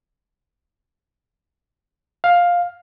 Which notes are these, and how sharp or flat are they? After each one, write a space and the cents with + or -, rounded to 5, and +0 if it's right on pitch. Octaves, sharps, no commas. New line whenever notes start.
F5 +10